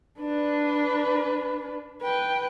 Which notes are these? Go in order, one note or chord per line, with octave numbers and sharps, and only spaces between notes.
D4 B4
B4 G5